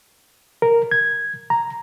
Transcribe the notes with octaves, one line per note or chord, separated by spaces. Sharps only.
A#4
G#6
A#5